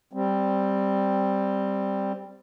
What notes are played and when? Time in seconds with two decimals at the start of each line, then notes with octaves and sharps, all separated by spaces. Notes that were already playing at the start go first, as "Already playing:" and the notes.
0.13 G3 C4